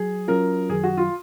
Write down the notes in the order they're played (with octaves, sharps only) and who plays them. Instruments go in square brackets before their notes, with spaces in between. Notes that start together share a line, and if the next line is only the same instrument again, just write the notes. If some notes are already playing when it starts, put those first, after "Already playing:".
Already playing: [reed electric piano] F#3 [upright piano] G#4
[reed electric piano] F#3 C#4 F4 [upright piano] A#4
[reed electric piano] F#2 D#3 F#3 [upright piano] G#4
[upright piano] F#4
F4